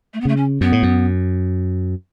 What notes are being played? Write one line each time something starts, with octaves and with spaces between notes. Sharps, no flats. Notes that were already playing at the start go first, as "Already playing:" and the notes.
A3
B3
C#3 A3
C#4
F#2 B3
A2
F#2